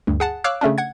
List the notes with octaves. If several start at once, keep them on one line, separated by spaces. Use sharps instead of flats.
D2 G2
G#4 F#5 A5
C#5 F5 D6 E6 F#6
C#3 A3 C#4 D4
F#5 G#6